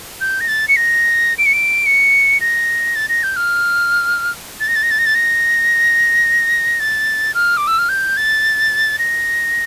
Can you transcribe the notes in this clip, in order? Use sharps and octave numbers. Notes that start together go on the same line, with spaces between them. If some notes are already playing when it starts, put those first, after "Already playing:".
G6
A#6
A6
C#7
A#6
D7
C#7
D7
C#7
A#6
A6
A#6
G6
F6
A6
A#6
A6
A#6
A6
A#6
A6
A#6
A6
F6
D6
E6
F6
G6
A6
A#6